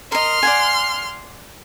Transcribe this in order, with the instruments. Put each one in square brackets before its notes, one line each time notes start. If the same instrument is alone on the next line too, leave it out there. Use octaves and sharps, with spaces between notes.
[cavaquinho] A#4 D#5 [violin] C6 F6
[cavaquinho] D5 F#5 G#5